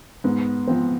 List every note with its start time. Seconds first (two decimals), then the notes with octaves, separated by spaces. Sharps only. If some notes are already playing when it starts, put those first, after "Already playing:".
0.24 G#2 B3
0.67 F3 B3 C4